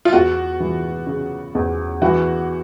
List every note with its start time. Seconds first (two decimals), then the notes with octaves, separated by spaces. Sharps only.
0.05 F4
0.13 E2 F#4
0.60 E3
1.07 C#3
1.55 E2
2.02 E3 F#4